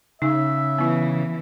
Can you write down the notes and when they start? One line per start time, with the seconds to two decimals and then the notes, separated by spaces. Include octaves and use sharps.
0.22 C#3 D#4 E5
0.78 E3 B3 E4